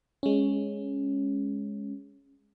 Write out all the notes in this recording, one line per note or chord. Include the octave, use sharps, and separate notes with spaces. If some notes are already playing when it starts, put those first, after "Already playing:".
G#3 C#4